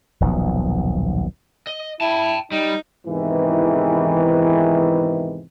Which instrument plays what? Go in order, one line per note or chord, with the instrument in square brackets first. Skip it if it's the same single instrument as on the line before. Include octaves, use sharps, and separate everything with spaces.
[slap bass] D#1 B1 F3 B3
[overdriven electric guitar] D#5
[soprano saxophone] E4 [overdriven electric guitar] G5 A5
[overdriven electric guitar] G3 [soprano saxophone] D#4
[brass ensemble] E2 G#2 C3 D#3 E3